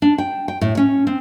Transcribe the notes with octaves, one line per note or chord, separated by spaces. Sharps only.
D4
G5
G5
A2
C#4
C4